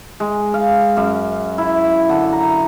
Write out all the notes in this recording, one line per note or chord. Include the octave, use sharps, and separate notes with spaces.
G#3
F5
F#2
E4
D3
A#5